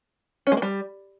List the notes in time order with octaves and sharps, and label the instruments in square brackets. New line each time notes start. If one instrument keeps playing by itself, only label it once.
[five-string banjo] C#4
G#3
A#3
G3